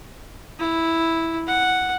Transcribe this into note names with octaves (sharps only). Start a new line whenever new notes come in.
E4
F#5